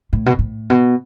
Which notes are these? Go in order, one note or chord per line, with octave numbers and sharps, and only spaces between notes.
A2
B2
A2
B2